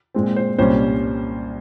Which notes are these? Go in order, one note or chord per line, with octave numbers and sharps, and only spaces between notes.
A#2 G#3 C4
C5
C2 A#2 G3 C#4 C5